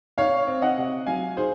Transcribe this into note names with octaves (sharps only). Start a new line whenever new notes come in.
D#4 C#5 F5
C4
D#5 F#5
C3
F#3 F5 G#5
D#4 G#4 C5